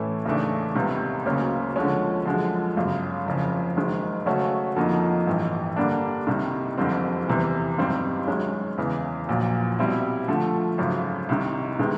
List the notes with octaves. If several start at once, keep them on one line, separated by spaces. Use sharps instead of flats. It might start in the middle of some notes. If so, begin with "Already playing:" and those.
Already playing: A2 E3 A3 C#4 E4
D#2 C#3 E3 A3 D4
C#2 C3 D#3 G3 B3
D2 C#3 F#3 A#3 C#4
D3 F3 G#3 C#4
F#2 D3 F3 G#3
G1 F#2 C#3
F#1 F2 C#3
F#1 F#2 D#3 G#3
C#3 F#3 A3 C#4 F#4
F2 D3 F3 A#3 D#4
A1 G2 E3
D3 G3 A#3 D4
C2 C3 D#3 G3
F#1 F2 D3 G3 C4
E2 C3 E3 G3
G1 F#2 D#3 G3 C4
F#2 D#3 G#3 C#4
E2 C#3 E3
A#1 A#2 F#3
B2 G3 C4 E4
D3 F3 A3
G#1 F#2 C#3
C2 C3 D#3
C3 D#3 G#3 B3